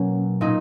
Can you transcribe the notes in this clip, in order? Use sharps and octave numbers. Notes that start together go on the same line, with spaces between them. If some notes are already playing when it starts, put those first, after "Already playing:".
Already playing: B2 F#3 A#3 C#4
A#2 A#3 D#4